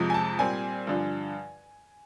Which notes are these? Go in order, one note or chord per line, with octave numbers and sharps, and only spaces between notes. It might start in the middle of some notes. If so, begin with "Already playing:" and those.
Already playing: F2 C3 F3 G#3
G#5
A5
A#2 G3 C4 G#5
G2 D3 F3